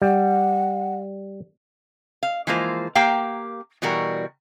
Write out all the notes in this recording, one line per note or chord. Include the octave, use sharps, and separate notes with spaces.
G3 F#5
F5
E3 F3 G#3 A#3 F4 C5
A#3 G4 A#4 F5 G5
B2 E3 G3 F#4 A#4